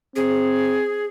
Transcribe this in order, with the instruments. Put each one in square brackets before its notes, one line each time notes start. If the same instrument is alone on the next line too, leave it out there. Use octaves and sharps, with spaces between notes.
[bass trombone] C4 [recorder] G#4